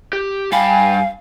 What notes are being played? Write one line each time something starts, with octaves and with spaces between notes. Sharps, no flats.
G4
G2 F5 G5 G#5 B5